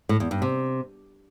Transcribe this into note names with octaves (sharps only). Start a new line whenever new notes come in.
A2
E2
G2
C3